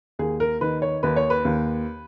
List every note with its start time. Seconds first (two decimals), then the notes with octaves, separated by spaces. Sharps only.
0.19 D#2 G#4
0.40 A#4
0.61 D#3 B4
0.82 C#5
1.03 D#2 B4
1.16 C#5
1.30 B4
1.45 D#2